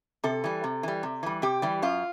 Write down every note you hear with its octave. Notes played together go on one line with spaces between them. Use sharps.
C3 A4
E3 G3
C3
E3 G3
C3
E3 G3
C3 G4
E3 G3
F#2 F4